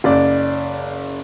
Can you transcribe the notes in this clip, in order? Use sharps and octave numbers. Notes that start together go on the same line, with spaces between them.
F#1 D5